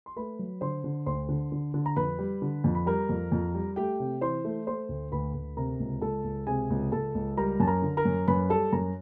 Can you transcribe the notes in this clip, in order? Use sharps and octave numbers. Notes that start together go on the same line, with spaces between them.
C6
A3 B4 B5
F#3
D3 C5 C6
D3
D2 C5 C6
D3
D3
D3
A#5
F2 B4 B5
G3
D3
F2
B5
G3 A#4 A#5
F2
F2
G3
A3 G4 G5
C3
E3 C5 C6
A3
A3 C5 C6
D2
D2 B4 B5
D2
C3 A#4 A#5
C#2
C#2 A4 A5
C#2
C3 G#4 G#5
C#2
C#2 A4 A5
C#2
G3 A#4 A#5
F#2 A5
A#4 A#5
D3
A#4 A#5
F#2
F#2 B4 B5
G3 A4 A5
F#2 A#4 A#5